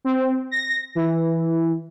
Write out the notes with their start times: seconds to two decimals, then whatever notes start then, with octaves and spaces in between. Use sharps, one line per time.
0.05 C4
0.51 A#6
0.95 E3